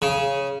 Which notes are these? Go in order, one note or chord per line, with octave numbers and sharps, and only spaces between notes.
C#3